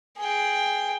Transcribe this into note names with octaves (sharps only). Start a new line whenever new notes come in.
G#4 G5